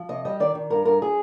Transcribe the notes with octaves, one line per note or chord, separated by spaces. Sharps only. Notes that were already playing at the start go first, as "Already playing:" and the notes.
Already playing: F3
C3 D#5
G3 D#5
D#3 D5
D#3
G2 A#4
G2 A#4
G#4